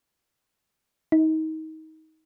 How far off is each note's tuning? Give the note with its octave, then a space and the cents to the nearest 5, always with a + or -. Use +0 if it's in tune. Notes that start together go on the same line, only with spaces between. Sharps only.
D#4 +25